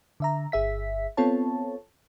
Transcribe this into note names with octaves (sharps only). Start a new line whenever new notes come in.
D3 E5 A#5
G1 G#4 E5 B6
B3 C4 F4 A4 C#5 A5